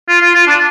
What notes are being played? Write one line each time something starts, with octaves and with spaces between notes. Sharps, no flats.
F4
F4
F4
D4